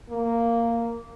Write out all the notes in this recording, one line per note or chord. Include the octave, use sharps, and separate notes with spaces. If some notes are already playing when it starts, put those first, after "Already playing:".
A#3